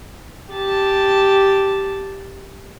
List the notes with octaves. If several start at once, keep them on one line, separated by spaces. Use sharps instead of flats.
G4 A5